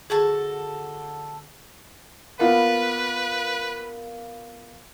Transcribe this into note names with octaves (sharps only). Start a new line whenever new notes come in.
D3 F#4 G#4 A4 A5
A#3 B3 F4 B4